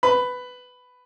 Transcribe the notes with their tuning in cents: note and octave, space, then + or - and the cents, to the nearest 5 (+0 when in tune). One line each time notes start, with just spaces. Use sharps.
B4 +10